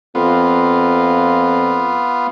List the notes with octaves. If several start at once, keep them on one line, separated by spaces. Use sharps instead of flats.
F2 B3 F4